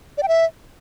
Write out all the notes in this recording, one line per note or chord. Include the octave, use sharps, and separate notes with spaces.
D5
G5
E5